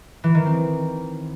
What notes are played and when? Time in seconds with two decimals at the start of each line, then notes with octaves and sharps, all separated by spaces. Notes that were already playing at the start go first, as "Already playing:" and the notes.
0.24 E3
0.35 D#3
0.46 C4